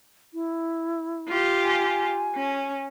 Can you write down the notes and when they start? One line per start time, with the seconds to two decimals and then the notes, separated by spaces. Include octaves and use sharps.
0.34 E4
1.28 F4 G4
1.63 G#5
2.35 C#4